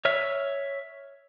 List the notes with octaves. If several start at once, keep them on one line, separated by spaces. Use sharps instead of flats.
C#5 E5 F6